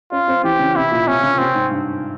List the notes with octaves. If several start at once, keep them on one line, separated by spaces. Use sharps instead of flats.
C#4 F4
C4
E3 G4
C#3
C3 E4
A#2
C3 C#4
C#3
C3 C4
G#2
G2